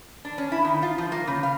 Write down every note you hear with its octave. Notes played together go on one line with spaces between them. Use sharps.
D4
C#4
E4
D#3
F4
F3
A#3
C#3
F5